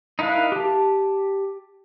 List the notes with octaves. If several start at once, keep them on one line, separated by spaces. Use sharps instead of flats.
D#4 E4 A#4 F5 F#6
G4 A5